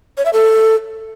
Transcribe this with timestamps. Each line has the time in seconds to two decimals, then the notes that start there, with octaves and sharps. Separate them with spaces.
0.18 C#5
0.25 E5
0.33 A4